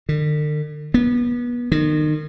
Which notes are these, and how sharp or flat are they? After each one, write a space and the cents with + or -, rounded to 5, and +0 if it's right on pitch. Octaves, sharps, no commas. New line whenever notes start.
D3 +45
B3 -30
D#3 -30